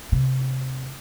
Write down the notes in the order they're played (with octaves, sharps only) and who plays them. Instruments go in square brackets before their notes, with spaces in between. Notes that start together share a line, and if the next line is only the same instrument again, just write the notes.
[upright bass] C3